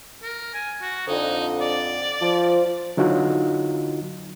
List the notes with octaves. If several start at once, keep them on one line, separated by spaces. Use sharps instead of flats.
A#4
G#5
F#4
F2 D3 D#4
D5
F3
D3 F#3 D#4 F4 F#4